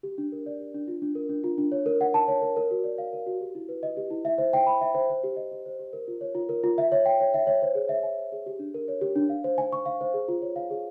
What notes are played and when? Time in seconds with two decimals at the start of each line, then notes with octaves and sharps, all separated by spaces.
0.03 G4
0.18 D4
0.32 A#4
0.46 D5
0.60 G4
0.74 D4
0.88 F4
1.02 D4
1.15 A#4
1.29 D4
1.44 F4
1.58 D4
1.72 C#5
1.86 A#4
2.01 F#5
2.14 A5
2.28 C#5
2.42 A#4
2.56 A#4
2.71 F#4
2.84 D5
2.98 F5
3.13 A#4
3.27 F#4
3.41 G4
3.55 E4
3.69 B4
3.83 D#5
3.97 G4
4.11 E4
4.25 E5
4.38 C5
4.53 G5
4.67 B5
4.81 E5
4.95 C5
5.10 C5
5.24 G4
5.36 D#5
5.52 G4
5.66 C5
5.79 G4
5.93 A#4
6.08 F4
6.21 C#5
6.35 F4
6.49 A#4
6.64 F4
6.78 E5
6.92 C#5
7.05 G5
7.20 C#5
7.34 E5
7.47 C#5
7.62 C5
7.75 G#4
7.89 E5
8.03 G#5
8.18 C5
8.32 G#4
8.46 G4
8.59 D4
8.74 A#4
8.88 C#5
9.01 G4
9.16 D4
9.29 F5
9.44 C5
9.58 G#5
9.72 C#6
9.86 F5
10.01 C5
10.14 G#4
10.28 F4
10.42 C#5
10.56 F5
10.70 G#4